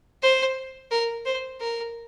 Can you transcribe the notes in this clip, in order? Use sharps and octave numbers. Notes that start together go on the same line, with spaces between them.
C5
A#4
C5
A#4